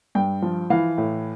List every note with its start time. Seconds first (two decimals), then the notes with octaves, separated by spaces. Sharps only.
0.15 G2 G5
0.42 F3
0.70 E3 F5
0.98 A2